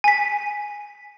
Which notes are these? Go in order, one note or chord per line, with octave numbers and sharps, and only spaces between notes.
G#5 B6